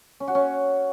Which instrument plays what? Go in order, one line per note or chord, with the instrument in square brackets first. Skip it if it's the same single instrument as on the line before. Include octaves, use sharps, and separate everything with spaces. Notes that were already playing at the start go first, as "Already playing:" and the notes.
[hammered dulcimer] C#4
F#4
C#4